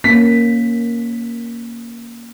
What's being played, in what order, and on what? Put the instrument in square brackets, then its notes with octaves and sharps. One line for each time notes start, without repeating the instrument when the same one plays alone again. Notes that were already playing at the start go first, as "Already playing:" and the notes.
[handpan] A#3 C#4 [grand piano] B6